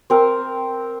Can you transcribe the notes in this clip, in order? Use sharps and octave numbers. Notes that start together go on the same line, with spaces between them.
C4 A#4